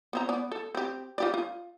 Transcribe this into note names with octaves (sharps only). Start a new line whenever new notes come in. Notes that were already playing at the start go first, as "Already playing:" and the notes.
B3 C4 A#5
B3 D5
A4
C4 G4
F4 G4 D5
F4